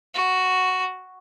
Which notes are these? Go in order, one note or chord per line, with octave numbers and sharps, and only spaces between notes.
F#4